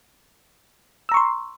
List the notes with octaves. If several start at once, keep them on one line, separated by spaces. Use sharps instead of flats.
A#5 C6 C#6 E6